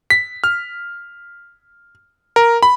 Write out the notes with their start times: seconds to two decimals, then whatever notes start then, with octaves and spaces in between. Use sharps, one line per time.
0.10 B6
0.44 F6
2.36 A#4
2.63 B5